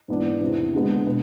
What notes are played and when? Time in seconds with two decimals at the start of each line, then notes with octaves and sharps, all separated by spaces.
0.08 G#2 E3 B3 D4
0.41 E2 C3 E3
0.74 D3 G#3 B3
1.07 B2 B3